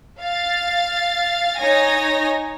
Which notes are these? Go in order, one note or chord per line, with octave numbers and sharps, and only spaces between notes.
F5 A6
D#4 C#5 G#5 A#6